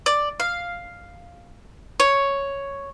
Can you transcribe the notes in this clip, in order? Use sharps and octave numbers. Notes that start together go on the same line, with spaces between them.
D5
F5
C#5